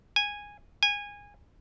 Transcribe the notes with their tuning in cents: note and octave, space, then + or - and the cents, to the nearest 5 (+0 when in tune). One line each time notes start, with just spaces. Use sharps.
G#5 -10
G#5 -20